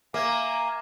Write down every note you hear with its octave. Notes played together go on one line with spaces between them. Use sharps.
A#3 E5 F5 G#5 D6